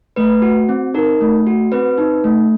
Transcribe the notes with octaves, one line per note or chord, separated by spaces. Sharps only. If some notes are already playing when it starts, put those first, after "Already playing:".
A3 B4
F#4
C4
D#4 A#4
A3
F#4
C4 B4
D#4
A3